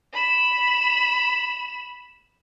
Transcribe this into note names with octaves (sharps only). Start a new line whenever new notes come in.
B5 E7